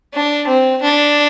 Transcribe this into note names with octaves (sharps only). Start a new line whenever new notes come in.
D4
C4
D4